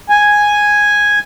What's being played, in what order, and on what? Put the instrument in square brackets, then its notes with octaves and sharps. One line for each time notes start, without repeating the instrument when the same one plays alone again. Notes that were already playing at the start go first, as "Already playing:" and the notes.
[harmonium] G#5